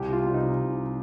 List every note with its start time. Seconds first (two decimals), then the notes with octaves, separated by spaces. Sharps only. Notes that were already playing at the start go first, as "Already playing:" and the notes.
Already playing: C2 G4
0.13 F4
0.23 C3 G3
0.34 D#4
0.56 C2